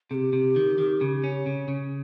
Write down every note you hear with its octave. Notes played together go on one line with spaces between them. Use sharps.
C3 G4 G#4
C3
D#3
D#3
C#3
C#4
C#3
C#3